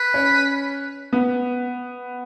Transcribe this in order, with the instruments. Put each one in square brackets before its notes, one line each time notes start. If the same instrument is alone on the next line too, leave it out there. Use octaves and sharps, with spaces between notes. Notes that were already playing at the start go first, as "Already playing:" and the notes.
Already playing: [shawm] B4
[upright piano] C#4
B3